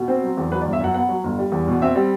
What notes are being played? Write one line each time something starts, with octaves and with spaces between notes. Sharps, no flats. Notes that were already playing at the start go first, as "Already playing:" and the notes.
Already playing: B2
C4 C5
F#3
E2
F#3 B4
D5
G1
E5
F#2 F#5
B3 F#5
F#3
G1
G3
E2
B2
C4 E5
G3